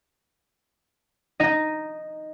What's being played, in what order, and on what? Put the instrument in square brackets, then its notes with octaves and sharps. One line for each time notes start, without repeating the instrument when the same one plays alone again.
[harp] D#4 D#5